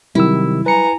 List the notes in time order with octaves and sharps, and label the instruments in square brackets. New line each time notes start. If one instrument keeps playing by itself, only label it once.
[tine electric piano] C3 D#3 E6 [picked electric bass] F#3 G3 [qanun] E4
[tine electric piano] B4 C#7 [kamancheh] G#5 A#5